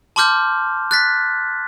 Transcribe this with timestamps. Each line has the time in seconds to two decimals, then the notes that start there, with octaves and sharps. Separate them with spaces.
0.16 A5 C6 D6 F6 G6
0.91 F#6 A6 B6